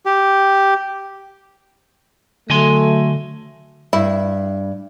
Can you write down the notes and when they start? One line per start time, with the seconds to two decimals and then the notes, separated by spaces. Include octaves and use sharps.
0.06 G4
2.50 D3 F#3 A3 D#5 G#5 C6
3.93 G2 E4